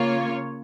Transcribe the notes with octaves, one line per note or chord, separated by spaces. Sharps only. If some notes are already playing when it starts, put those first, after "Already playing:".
Already playing: C#3 A#3 F4 C#5